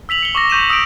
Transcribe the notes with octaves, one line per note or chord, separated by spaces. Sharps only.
E6 B6 F7 F#7
C#7 G7
C#6 D6 A#6
C#6 G6 D#7 E7
D#6 E6 G6 A#6 D7